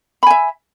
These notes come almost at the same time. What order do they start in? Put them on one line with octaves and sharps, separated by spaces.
B5 G#5 E5